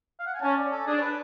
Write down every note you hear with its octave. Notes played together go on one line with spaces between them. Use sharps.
F5
F#5
G#5
C#4 A5
D5
A4
D4 G#4
C#5
B4